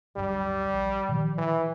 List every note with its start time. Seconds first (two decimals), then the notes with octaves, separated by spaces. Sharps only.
0.17 D1 G1 G2 G3
0.73 A#1
1.09 A#2 D#3 F3
1.38 E3